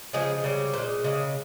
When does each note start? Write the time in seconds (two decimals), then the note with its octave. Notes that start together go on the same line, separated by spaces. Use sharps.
0.13 C#3 F3 G#3 G#4
0.44 C#3 G3
0.73 A#2 G#3 C5
1.04 C#3 G#3